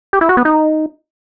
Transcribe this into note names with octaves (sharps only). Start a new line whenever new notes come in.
G4
E4
F#4
B3
D#4